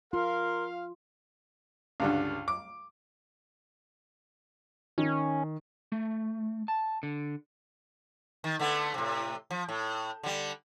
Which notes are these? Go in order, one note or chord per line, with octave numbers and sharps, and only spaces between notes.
F4 A#4 F5 C6
C#2 G2 D3
D6
D#3 C#4
A3
A5
D3
D#3
D3 A3 B3
A2 C3
F3
A2
D3 G3